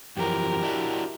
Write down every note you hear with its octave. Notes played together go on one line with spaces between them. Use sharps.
F#2 E3 F3 G4 A#4
D4 E4 F#4